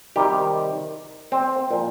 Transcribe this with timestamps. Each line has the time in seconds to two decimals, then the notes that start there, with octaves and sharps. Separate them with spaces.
0.16 C3 D#3 G3 G4
1.32 C4
1.71 A#2 F3